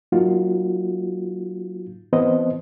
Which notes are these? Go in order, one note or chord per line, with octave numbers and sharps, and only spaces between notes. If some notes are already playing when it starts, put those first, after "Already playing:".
F#3 A#3 D#4 F4 F#4
E3 B3 C4 C5 D#5